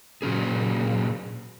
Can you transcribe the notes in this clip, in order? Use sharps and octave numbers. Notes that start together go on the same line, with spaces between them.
A#2 F#3 C#4 G#4